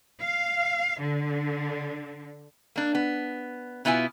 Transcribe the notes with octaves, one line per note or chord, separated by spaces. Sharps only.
F5
D3
A#3 D4
B3
B2 B3 E4 F4 G#5